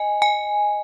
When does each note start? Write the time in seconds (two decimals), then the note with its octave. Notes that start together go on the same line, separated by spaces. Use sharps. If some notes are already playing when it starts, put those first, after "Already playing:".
Already playing: D#5 G#5
0.22 G#5